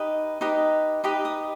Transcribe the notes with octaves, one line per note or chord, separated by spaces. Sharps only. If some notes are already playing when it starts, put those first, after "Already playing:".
Already playing: D#4 G4 B4 D#5
D#4 G4 B4 D#5
D#4 G4 B4 D#5 B5
D#6